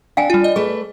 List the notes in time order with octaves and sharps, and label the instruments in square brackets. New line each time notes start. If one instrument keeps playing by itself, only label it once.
[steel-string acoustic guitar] D4 [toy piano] F5 G5 G#5
[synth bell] G3 F4
D#5
[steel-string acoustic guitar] A3 B4 [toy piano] G#4